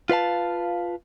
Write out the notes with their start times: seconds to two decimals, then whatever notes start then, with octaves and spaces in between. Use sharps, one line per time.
0.10 F4 B4 F5 A5